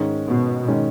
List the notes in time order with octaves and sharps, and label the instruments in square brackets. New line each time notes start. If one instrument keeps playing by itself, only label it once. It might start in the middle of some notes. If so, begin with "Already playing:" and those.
Already playing: [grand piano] G#2 D#3 G#3 C#4
[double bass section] B2
[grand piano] D#3 G#3 C#4